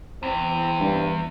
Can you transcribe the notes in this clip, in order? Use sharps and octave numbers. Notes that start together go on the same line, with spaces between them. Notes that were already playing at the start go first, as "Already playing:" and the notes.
E2 C4
G2